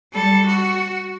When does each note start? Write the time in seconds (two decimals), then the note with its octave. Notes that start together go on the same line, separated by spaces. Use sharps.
0.13 G3 A4
0.46 F#4